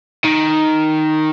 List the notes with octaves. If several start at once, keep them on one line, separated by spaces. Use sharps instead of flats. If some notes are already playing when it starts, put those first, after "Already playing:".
D#3